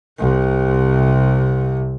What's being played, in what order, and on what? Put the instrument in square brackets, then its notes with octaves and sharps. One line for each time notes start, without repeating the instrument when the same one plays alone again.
[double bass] C2 C3